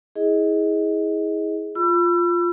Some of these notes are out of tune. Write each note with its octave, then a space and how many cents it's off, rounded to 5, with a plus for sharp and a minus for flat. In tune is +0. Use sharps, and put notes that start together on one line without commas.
E4 -25 G#4 +0 D#5 +15
F4 +0 B5 +0 E6 +35